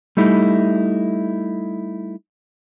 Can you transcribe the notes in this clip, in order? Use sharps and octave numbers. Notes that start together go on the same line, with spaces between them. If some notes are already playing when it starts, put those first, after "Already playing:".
G3 A3 D#4 E4